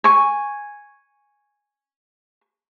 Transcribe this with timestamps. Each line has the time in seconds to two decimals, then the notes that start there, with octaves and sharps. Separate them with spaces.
0.04 G#5 C#6